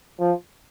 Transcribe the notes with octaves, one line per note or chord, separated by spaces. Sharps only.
F3